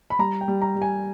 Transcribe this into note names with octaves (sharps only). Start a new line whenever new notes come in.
B5
G3 A#5
G5
G3
A#5
G3
G#5